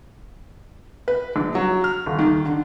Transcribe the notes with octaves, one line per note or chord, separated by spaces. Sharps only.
B4
A#1
F#3
F6
D#1
D#3
D3